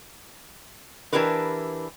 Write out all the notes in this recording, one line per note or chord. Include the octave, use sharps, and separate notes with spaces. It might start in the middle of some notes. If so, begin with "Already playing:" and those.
E3 D4 E4 G4 A#4 B4